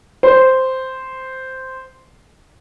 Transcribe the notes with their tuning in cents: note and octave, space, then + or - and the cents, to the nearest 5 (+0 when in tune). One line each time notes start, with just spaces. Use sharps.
C5 -5